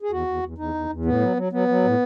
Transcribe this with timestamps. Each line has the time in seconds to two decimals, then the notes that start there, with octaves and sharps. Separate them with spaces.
0.02 G#4
0.11 E2 F#4
0.27 E2
0.43 E2
0.58 E2 D#4
0.74 E2
0.90 E2
1.05 A2 B3
1.21 F#3
1.37 F#3
1.52 F#3 B3
1.68 F#3
1.84 A2